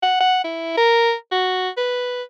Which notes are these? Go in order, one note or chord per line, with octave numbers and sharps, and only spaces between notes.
F#5
F#5
E4
A#4
F#4
B4